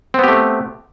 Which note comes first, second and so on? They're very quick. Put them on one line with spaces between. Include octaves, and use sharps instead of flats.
C4 B3 G4 A3